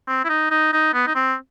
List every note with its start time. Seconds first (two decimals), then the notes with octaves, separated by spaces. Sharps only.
0.07 C4
0.24 E4
0.29 D#4
0.51 D#4
0.73 D#4
0.94 B3
1.07 D#4
1.15 C4